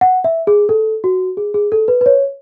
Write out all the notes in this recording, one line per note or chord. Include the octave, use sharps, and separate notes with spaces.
F#5
E5
G#4
A4
F#4
G#4
G#4
A4
B4
B4
C#5